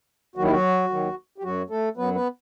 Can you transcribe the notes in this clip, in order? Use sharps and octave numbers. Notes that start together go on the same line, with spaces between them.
D#2 D#3 F#3 F#4
E4
F#3 F#4
D#2 D#3 F#3
G4
F#2 F#3 F#4
A3 A4
F#2 F#3 B3 B4
B3 B4